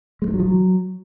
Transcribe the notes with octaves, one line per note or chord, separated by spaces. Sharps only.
G#3
G2
F#3
F3
F#3